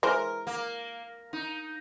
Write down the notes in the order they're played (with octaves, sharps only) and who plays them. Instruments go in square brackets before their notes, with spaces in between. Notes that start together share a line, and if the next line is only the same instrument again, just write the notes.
[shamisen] E3 G#3 C5 [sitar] A#4
[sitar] A#3
D#4